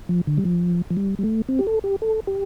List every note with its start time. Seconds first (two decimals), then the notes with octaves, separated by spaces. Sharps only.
0.09 F3
0.27 D3
0.38 G3
0.45 F3
0.90 F3
0.97 G3
1.19 G3
1.23 A3
1.49 C4
1.59 G4
1.67 A4
1.84 G4
2.02 A4
2.27 G4